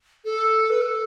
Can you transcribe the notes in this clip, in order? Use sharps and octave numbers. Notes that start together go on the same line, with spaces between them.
A4
B4
A4